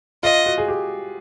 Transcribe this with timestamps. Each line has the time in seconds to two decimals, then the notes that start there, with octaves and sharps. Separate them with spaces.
0.23 F4 D#5
0.46 F#4
0.58 G#4
0.68 G4